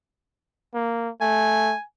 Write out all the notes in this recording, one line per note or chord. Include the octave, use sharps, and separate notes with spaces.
A#3
A3 G#5